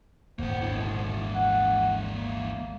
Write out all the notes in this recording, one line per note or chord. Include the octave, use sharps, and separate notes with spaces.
D#1 G#1 A2 D3 F3 A#3 C5 F#5
D4 E4
G#2 B2 D3 G#3 B3
F#5
A#3